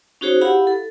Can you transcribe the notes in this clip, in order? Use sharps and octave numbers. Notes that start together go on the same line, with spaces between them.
C#4 D#4 F#4 G#4 C5 C#5
E4 G4 F5 F#5 B5
A4